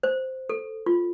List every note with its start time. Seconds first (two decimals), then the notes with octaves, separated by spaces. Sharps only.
0.03 C5
0.50 A4
0.86 F4